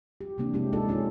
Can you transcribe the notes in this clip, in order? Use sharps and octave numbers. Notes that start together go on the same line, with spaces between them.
G4
C3 F3 A#3 C4 D4
G#3 C#4 E4 G4
D#4 F4 A4 D5
C4 C#4 D#4 F4 G#4